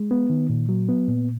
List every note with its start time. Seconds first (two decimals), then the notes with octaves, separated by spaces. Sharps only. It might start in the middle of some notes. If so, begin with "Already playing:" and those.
Already playing: G#3
0.11 B3
0.30 D#3
0.50 A#2
0.69 F#3
0.89 B3
1.08 A#2